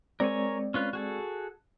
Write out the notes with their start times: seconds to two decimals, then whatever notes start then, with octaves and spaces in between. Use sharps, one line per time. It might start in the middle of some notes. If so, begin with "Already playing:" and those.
0.20 G#3 C4 A#4 C#5 D5 G#5
0.74 C#4 F4 B4
0.93 F#4 G#4 A4